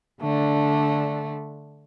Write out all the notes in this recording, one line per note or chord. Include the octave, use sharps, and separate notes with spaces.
D3 A3 D4